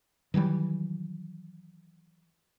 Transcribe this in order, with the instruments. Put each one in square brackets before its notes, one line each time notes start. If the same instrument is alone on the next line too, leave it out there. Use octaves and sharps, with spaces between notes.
[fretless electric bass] D#3 E3 F#3 G3